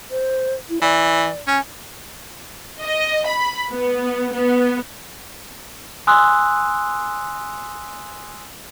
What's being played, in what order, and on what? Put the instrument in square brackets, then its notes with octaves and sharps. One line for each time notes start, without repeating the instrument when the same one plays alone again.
[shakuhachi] C5
E4
[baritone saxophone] E3 [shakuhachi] D5
[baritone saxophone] C#4 [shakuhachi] G#5
[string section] D#5
B5
B3
B3
[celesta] G#5 C6 D#6 E6 F#6